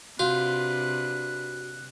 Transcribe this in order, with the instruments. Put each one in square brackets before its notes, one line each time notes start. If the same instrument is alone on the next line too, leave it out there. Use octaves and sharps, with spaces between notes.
[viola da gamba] C3 D4 B4 [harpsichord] F4 [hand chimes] F#4 [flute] F#6